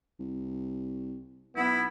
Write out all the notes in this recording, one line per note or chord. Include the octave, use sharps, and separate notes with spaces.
C2
B1 B3 E4